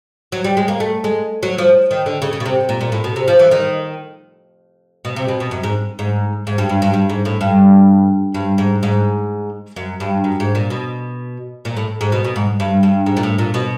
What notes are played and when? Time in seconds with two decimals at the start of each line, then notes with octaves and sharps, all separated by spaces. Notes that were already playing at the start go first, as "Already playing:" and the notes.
0.32 F#3
0.44 G3
0.57 G#3
0.68 A#3
0.80 A3
1.04 G#3
1.43 F#3
1.58 F3
1.91 D#3
2.06 D3
2.22 C#3
2.33 C#3
2.40 B2
2.46 C3
2.69 A#2
2.81 A#2
2.92 A2
3.04 B2
3.16 C3
3.28 F3
3.39 E3
3.51 D#3
5.05 B2
5.16 C3
5.28 B2
5.40 B2
5.51 F#2
5.63 G#2
5.99 G#2
6.47 G#2
6.58 G2
6.69 G2
6.82 G2
6.93 G2
7.10 G#2
7.25 A2
7.41 G2
8.34 G2
8.58 G#2
8.83 G#2
9.76 F#2
10.00 G2
10.24 F#2
10.40 G#2
10.55 A#2
10.70 B2
11.65 A#2
11.77 A2
12.01 G#2
12.12 B2
12.24 B2
12.36 G#2
12.60 G2
12.83 G2
13.06 G#2
13.17 A#2
13.23 A2
13.38 A#2
13.54 B2